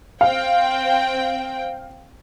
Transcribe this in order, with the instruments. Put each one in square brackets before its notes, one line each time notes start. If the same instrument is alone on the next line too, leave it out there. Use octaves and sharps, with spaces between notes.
[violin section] C4 G5 [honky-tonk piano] F5